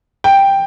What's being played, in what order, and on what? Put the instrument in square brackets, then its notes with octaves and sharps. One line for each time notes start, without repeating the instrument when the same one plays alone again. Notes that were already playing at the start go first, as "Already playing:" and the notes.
[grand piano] G5